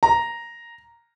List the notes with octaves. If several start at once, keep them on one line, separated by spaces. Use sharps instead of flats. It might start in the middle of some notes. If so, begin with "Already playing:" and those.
A#5